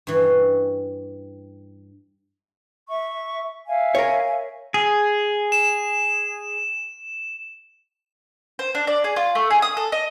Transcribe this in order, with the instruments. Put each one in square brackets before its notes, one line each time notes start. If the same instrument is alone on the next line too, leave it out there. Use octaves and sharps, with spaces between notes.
[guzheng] G2 E3 C#4
[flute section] E5 C#6
E5 F5 G#5
[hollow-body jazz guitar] A#4 C#5
[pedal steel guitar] G#4
[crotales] E7
[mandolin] C5
D4
D5
G#4
F4
A3
G#4
D#6
A4
D#5